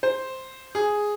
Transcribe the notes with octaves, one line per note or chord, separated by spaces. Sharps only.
C5
G#4